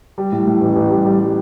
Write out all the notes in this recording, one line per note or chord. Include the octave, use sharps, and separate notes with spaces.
G3
A2
A2
A1
A1
G3
G3
G3